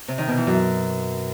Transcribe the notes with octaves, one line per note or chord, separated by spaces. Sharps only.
C3
D#3
B2
E3
F#2